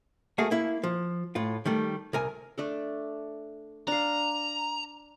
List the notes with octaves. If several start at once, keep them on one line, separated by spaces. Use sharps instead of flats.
A3 A#3 F#4 G#4
A#3 E4
F3
A2 F4
D#3 G3 A3
C2 A#4 G#5
A3 D4 A4
D4 F5 A#5